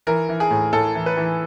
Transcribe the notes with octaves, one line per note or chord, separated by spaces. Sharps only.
E3 A#4
E3
G#4
A2
A2 A4
E3
B4
E3